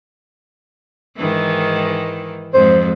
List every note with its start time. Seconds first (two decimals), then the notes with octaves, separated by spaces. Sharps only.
1.17 G#2 D#3 E3
2.54 F2 G#2 G#3 C5